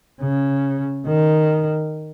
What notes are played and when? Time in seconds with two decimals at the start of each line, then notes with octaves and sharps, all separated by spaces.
0.21 C#3
1.07 D#3